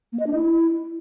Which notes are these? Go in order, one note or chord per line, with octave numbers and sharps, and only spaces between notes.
A#3
D#5
D4
E4